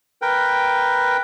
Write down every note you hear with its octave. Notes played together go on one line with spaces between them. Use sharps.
A#4 B4 G5